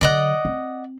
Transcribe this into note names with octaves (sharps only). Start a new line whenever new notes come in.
D3 F#3 D5 D#5 F#5
C4